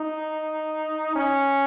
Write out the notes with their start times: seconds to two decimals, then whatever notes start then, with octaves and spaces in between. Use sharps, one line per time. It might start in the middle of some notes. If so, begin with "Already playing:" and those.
Already playing: D#4
1.16 C#4